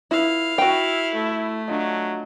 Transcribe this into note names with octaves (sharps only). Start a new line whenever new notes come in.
E4 F4 B4 F5 B5
E4 F#4 G5
A3
F#3 D4 F4 D#5